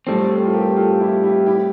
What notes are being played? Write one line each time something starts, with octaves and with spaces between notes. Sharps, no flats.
A2 G3 C4 F4 A4
A4
G4
F4 A4
G4 A#4
F4 A4
E4 G4
E4 G4
E4 G4